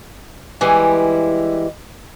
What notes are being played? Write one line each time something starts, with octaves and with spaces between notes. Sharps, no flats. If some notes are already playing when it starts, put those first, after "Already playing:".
E3 G3 G#3 E4